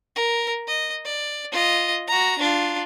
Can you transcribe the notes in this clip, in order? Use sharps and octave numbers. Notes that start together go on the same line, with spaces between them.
A#4
D#5
D5
F4 D#5
F#4 A#5
D4 F4